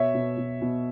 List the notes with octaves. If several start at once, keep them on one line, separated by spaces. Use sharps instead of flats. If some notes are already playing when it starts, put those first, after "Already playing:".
Already playing: B2 C#5 E5
B2
B2
B2